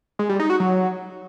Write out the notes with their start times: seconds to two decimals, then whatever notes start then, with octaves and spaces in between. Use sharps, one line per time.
0.19 G#3
0.29 G3
0.40 D#4
0.50 F#4
0.60 F#3